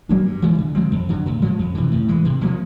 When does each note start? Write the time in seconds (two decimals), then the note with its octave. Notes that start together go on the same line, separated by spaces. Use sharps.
0.09 F#3 A#3 D4
0.26 G2
0.42 E3 G#3
0.59 D3
0.75 F3 G#3 C4
0.92 F2
1.09 D3 F#3
1.26 A2
1.42 F3 G#3 C#4
1.59 F2
1.75 C3 E3
1.92 A2
2.08 E3 G#3
2.25 C3
2.42 F3 A#3 C#4